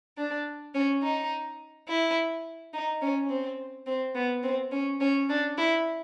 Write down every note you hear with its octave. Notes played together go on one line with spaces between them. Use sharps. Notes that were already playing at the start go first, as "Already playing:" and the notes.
D4
C#4
D#4
E4
D#4
C#4
C4
C4
B3
C4
C#4
C#4
D4
E4